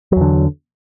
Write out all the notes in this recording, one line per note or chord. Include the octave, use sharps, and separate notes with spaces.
E2 D3 F#3